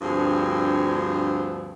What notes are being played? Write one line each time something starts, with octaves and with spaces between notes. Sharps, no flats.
D2 G2 F3 C4 G#4